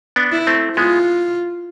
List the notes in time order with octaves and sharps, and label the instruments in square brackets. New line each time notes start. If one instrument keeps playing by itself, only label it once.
[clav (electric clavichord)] B3 D4
[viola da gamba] E4
[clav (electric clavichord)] A3 C4
[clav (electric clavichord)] G#3 B3 [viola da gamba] F4